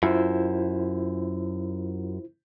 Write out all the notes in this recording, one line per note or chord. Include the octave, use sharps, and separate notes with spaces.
F#2 E4 F4 C5